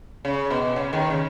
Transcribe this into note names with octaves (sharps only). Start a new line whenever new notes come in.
C#3
B2
C#3
D#2 D#3
C#3